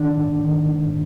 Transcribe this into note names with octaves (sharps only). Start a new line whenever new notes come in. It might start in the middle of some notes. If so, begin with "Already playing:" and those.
Already playing: D#3 D4
G#2
D#3
G#2